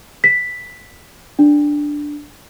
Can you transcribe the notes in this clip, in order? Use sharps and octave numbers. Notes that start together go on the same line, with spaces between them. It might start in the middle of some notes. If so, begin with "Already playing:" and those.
B6
D4